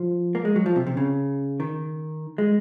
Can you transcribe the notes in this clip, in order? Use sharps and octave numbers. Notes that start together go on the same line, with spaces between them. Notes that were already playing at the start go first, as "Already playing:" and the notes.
Already playing: F3
A#3
G#3
F#3
F3
C3
C3
C#3
D#3
G#3